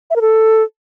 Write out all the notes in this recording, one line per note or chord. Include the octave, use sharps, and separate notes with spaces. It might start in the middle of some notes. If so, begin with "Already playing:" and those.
E5
A#4
A4